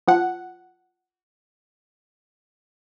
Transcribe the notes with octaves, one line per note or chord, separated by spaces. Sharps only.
F3 F#5